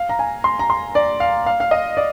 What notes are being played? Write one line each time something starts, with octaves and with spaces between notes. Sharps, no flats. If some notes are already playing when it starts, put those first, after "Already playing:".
Already playing: F5
A#5
G#5
C6
A#5
C6
D5
F5
F5
F5
D#5
D5